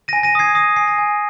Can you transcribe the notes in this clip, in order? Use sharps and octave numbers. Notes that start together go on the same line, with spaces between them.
A#6 D#7
G#5
A#6 D#7
D#6 G#6 C7
D#6 A#6 D#7
G#5 C7
A#6
G#5